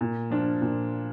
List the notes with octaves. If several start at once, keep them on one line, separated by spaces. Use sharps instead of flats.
A#2
F3 D4 F4
A#2